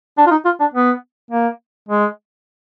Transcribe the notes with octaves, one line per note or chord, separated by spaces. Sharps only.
D4
F4
D#4
F4
D4
B3
A#3
G#3